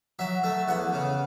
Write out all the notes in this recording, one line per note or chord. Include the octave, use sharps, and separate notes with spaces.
F#3 E5
A3 E5
E2 F#5
C#3